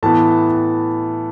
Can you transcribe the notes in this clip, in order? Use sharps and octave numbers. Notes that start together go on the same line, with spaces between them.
A2 E3 B3 A5